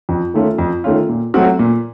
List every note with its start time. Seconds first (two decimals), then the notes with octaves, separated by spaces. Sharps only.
0.09 F2
0.34 D#3 A3 C#4 F4
0.59 F2
0.84 D#3 A3 C#4 F4
1.09 A#2
1.34 F#3 A3 C4 F#4
1.59 A#2